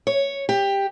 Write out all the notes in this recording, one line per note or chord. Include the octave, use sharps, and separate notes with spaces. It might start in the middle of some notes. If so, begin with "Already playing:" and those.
C#5
G4